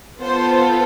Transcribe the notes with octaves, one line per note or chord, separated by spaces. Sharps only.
B3 F4 A4 C5